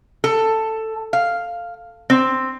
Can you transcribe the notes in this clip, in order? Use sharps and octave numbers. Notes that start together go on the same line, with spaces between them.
A4
F5
C4